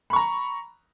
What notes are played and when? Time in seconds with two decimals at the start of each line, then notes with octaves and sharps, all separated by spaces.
0.10 B5
0.13 C#6
0.16 A#5